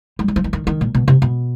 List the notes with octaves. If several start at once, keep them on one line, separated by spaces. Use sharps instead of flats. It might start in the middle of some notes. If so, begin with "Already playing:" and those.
G3
F#3
F3
E3
D#3
D#3
A#2
B2
C3
B2